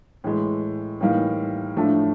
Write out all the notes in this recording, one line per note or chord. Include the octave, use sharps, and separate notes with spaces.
A2 E3 G#3
A2 E3 G3 A#3 D#4
A2 F3 A3 D4